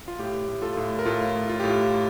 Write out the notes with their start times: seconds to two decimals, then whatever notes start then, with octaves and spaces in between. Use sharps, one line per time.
0.08 F4
0.19 A2 G4
0.48 A2
0.62 F4 A4
0.77 A2
0.99 A#4
1.05 A2 F4 A4
1.35 A2
1.49 F4
1.60 A2 G4
1.69 F4
1.94 A2